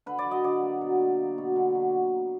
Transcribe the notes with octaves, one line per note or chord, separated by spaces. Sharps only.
D3 B4
D5
F#3
D#5
D3 D5
A#3
B2
A#3
A#3
B2
D3
F#3